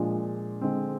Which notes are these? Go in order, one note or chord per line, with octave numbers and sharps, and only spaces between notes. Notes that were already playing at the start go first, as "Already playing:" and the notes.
Already playing: A#2 F3 G#3 D4
D3 G#3 C4